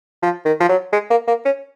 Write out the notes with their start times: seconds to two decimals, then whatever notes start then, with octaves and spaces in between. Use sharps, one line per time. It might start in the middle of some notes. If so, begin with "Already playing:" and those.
0.22 F3
0.45 D#3
0.60 F3
0.69 F#3
0.93 G#3
1.10 A#3
1.28 A#3
1.45 C#4